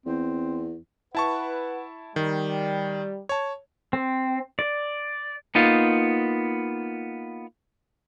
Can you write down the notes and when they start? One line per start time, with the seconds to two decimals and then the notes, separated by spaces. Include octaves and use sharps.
0.06 E2 C4
1.15 E4 B4 F#5 A5 C#6
2.16 D#3 G3
3.29 C#5 A5
3.93 C4
4.59 D5
5.55 A#3 B3 D#4 F4